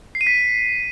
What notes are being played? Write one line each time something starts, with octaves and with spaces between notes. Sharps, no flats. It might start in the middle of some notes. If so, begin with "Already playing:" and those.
C7
D#7
B6